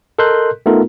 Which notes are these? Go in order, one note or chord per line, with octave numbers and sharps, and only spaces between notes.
A4 A#4 D#5 C6 F#6 G6
A3 B3 D#4 F4 A4 A#4